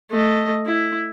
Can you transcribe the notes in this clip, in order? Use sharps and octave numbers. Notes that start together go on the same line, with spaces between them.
A3 D#5
E4